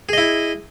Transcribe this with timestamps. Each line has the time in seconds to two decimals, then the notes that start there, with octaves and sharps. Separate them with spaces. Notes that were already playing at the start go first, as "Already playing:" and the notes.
0.09 G#4
0.13 D#5
0.18 E4